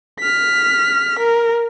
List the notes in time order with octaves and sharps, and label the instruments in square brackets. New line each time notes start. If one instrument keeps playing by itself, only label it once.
[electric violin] F6 B6
A#4